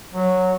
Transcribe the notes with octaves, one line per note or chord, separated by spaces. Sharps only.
F#3